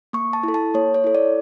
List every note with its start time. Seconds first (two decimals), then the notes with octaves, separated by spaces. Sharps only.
0.13 A#3 C#6
0.33 A5
0.43 E4 A4
0.54 A5
0.74 A#3 C#5
0.94 C#5
1.04 E4 A4
1.15 D5